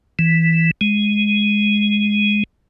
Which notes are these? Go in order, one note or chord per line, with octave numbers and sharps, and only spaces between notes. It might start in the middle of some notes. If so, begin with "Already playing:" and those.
E3
G#3